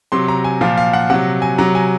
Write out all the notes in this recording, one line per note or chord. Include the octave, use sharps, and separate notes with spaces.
C3 F#3 C6
A#5
G#5
A#2 F3 F5
F5
F#5
C3 F#3 F#5
G#5
C3 F#3 A#5
G#5